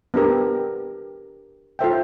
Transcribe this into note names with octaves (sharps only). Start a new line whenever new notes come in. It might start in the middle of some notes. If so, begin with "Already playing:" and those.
B3 D4 G4 A#4
F4 A4 C5 E5 G5